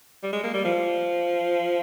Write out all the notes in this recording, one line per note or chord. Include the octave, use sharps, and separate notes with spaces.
G3
G#3
A#3
G3
F3